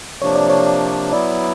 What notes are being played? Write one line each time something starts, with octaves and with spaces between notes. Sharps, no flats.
C3 F3 A#3 D4 C#5
D5
C#5
F#3 B3 E4 D5